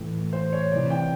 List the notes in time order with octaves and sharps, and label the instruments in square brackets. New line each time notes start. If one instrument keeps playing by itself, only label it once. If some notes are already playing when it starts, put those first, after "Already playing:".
Already playing: [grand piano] A2 E3
C5
C#5
C3 E3 D5
G5